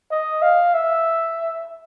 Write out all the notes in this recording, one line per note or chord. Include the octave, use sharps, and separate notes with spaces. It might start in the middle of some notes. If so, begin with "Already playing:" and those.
D#5
F5
E5